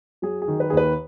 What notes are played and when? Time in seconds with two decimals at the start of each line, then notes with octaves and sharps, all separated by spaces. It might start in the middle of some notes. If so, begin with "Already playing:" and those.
0.22 F#3 G#4
0.42 G#4
0.48 D#3
0.60 B4
0.70 D#2 G#4
0.77 B4